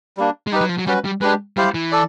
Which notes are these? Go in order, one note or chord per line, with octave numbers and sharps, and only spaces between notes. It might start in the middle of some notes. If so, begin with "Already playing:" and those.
G3 A#3 D4
G#3
G3 D#4 G4 B4
F#3
F3
F#3
G3 C#4 F#4 B4
G3
G#3 D4 G4 B4
G3 E4 G4 C5 F5
E3
A4 D5